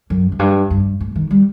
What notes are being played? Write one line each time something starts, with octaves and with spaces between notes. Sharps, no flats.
F#2
F#2
G2
G2
A2
D#3
G3